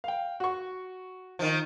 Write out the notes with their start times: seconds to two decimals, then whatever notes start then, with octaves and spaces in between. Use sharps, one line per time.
0.04 F5 G5
0.40 F#4 C#6
1.39 D#3 F3